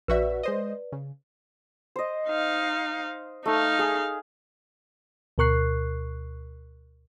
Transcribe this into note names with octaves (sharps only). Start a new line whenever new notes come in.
A#1 F#4 B4 D5 E5
G#3 C5 D#5
C#3
C5 D#5
D#4 F5
A3 D#4 F5
G#4
D2 B2 A#4 C#6 F#6 C7